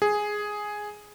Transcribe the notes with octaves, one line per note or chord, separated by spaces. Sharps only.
G#4